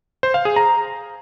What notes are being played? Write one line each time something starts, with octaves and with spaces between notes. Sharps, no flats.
C5
F5
G#4
A#5